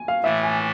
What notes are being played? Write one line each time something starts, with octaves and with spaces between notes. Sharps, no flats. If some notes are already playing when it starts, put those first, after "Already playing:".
Already playing: G#5
F5
A2 E3 A3 E5
G#5